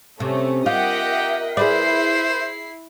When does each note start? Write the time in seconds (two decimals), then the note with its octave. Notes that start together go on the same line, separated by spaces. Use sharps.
0.20 C3 A3 C#4
0.66 F4 G4 A#4 D#5 E5 F#5 G5
1.57 E4 G#4 B4 C5 D5 C7